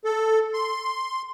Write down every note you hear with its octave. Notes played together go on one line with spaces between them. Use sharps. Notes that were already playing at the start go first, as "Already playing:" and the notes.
A4
C6